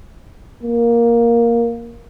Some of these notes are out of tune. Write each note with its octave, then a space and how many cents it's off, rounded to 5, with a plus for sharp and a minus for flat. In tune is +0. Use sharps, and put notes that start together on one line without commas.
A#3 +5